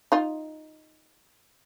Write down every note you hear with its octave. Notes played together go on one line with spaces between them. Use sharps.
D#4 F4